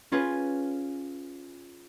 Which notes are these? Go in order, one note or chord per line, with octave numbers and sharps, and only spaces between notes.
C#4 F4 G#4 B4 G#5